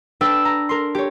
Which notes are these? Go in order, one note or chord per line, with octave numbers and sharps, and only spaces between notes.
D4 B4 G5 E6
A#5
A#4 C6
G4 C#5